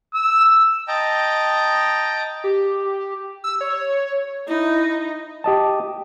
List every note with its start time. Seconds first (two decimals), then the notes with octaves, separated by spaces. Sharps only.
0.15 E6
0.88 D#5 G5 A5 A#5
2.44 G4
3.44 E6
3.61 C#5
4.48 D#4 E4
5.44 G4 D#5 A5